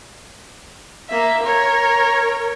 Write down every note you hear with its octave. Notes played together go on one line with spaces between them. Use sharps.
A#3 E5
A#4 C#5